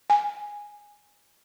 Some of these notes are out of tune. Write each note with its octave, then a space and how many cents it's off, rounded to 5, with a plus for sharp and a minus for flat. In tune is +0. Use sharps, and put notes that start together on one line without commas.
G#5 -10